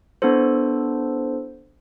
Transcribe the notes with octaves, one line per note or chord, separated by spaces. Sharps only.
B3 D4 E4 A4 C5